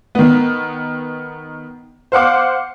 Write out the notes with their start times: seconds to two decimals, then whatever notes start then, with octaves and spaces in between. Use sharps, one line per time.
0.15 D#3 B3
2.12 C5 F5 F#5 D6